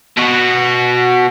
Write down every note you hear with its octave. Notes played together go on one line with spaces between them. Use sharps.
B2 F#4